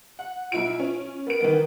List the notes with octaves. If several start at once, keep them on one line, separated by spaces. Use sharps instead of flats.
F#5
B1 E4 F4 D7
C#4
B3 A#4 D7
D#3 E3 B3